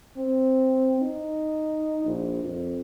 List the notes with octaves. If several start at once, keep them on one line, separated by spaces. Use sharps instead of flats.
C4
D#4
A#1
F2